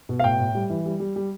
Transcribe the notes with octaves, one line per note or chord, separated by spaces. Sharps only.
B2
F5
A2 G5
A2
G3
E3
G3
G3
G3